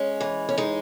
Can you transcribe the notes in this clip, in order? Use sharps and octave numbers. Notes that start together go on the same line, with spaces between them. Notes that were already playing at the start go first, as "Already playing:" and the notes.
Already playing: G#3 C#4
E3
C#4
G#3 D#4